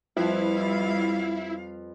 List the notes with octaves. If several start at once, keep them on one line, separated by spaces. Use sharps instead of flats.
F2 G3 E4 B4 F5